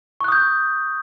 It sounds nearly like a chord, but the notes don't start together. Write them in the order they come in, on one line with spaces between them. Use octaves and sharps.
C#6 F#6 D#6 G6